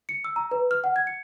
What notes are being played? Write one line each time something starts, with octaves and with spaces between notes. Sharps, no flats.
C#7
E6
A#5
B4
F6
F#5
G#6
C#7